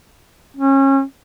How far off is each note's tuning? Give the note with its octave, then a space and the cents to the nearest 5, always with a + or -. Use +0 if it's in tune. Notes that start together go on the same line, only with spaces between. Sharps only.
C#4 -30